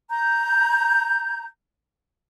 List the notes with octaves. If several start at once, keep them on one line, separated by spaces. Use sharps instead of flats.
A#5 G6